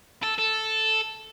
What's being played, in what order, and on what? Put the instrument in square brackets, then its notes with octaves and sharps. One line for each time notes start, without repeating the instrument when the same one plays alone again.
[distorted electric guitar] A4
A4